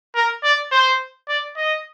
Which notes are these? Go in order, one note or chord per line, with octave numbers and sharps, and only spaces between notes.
A#4
D5
C5
D5
D#5